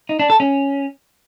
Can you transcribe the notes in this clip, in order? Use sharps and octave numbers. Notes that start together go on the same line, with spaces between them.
D#4
D4
A4
C#4